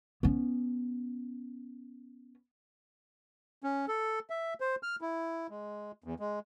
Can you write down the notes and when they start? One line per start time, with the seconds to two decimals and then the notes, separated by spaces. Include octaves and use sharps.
0.23 B3 C#4
3.64 C#4
3.88 A4
4.30 E5
4.60 C5
4.83 F6
5.01 E4
5.50 G#3
6.04 E2
6.20 G#3